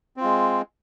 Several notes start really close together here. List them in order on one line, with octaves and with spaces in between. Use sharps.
C4 F4 G#3